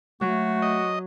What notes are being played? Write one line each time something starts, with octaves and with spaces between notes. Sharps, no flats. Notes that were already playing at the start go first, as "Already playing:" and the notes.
F#3 A3 F#4
D#5